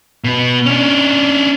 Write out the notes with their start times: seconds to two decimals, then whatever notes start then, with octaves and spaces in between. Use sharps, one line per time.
0.24 B2 B3
0.66 C#4 D4